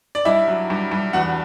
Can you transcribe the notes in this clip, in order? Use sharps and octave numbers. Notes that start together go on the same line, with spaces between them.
D5
G2 E4 E5
F#3
G2
G2
E2 F#4 F#5